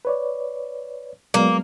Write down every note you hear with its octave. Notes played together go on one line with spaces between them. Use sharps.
B4 C#5 D5
F#3 G#3 A#3 B3